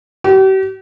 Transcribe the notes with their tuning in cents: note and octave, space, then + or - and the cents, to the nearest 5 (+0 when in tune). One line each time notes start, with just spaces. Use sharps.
G4 -40